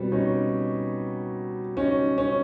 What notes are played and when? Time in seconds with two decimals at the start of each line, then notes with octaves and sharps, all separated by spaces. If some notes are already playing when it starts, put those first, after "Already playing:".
Already playing: B2 G3 C4
0.12 C#4 D#4
1.77 C#4 D#4
2.18 C#4